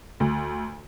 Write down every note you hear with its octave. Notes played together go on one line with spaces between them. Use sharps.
D2